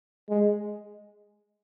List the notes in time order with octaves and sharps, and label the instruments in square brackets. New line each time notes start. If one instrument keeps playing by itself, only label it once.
[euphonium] G#3